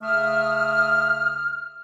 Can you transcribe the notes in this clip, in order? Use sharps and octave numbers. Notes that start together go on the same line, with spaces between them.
C#3 A3 E5 D#6 F6